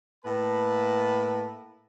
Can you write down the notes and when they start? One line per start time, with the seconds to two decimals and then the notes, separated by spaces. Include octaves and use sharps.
0.25 A2 A#3 B4 A5 B5